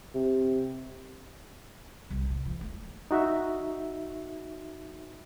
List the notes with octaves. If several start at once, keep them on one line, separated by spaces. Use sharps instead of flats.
C3
C2
A2
F3
A3
D#4 F#4 E5